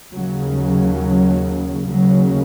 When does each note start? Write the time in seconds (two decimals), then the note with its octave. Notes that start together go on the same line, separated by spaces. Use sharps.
0.12 D#2 C#3 F#3
0.56 F#3
1.88 D#2 C#3 F#3